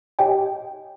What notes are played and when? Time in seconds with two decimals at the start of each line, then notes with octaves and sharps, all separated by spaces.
0.19 G4 C#5 D#5 G5 G#5